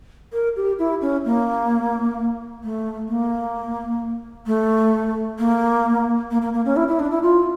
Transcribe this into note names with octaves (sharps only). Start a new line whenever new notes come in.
A#4
G4
E4
C#4
A#3
A3
A#3
A3
A#3
A#3
A#3
A#3
C#4
E4
E4
D4
E4
F4